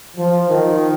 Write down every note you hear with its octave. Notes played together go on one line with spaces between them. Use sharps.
F3
D#3 F3